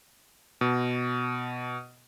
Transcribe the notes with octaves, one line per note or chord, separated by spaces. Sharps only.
B2